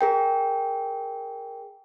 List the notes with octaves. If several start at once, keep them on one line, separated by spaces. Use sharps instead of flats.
G#4 A#4 G5